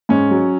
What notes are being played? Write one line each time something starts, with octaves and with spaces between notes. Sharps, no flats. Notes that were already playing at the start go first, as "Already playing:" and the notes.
G#2 C#4
F#3